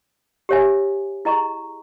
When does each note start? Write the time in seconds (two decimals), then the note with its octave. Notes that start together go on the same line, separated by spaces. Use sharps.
0.49 G4 C#5 E5 G#5
1.25 E4 G#4 D#5 A#5 C#6